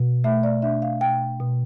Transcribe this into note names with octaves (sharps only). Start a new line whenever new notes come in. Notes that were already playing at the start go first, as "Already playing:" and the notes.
Already playing: B2
A3 E5
D5
D4 E5
F5
B2 G5
B2